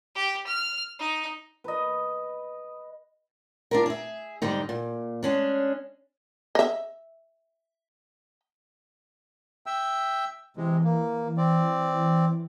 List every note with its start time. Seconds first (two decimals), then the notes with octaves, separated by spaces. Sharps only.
0.15 G4
0.47 F6
0.99 D#4
1.64 B4 D#5
3.71 D4 F4 A#4
3.86 G#4 E5
4.42 G#2 D3 G3 D#4
4.69 A#2
5.23 G#3 C#4 D4
6.55 D#5 E5
9.66 E5 G5 E6
10.57 C3 E3 G#3
10.84 A#3
11.37 C4 D5